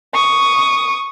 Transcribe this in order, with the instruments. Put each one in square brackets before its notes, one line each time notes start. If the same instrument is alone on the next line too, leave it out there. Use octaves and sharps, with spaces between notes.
[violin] C#6 D#6